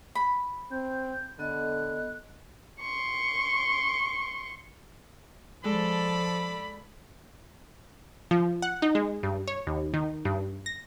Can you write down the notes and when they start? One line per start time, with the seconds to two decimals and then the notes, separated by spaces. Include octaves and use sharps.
0.15 B5
0.71 C4 G6
1.39 D3 B3 A4 D#5 F#6
2.80 C6 C#6
5.64 F3 G#3 A4 D5 B5
8.31 F3
8.62 F#5
8.82 D#4
8.95 G#3
9.23 G2
9.48 C#5
9.67 D#2
9.94 D#3
10.25 G2
10.66 A#6